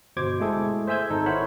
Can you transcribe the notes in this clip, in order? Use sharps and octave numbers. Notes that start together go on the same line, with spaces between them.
G1 B2 C5 D6 G#6
G#3 A3 E4 G#4 A4
C5 E5 G#5 E6 G6 G#6
G#1 D#4 A4
E4 A#4 C5 C#5 F#5 B5